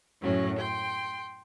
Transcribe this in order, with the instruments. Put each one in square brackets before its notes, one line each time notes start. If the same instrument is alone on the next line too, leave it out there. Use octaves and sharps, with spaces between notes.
[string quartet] F#2 A2 F#3 C#4
G5 C6